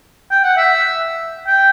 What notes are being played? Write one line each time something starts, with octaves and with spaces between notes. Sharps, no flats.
G5
F#5
E5
G5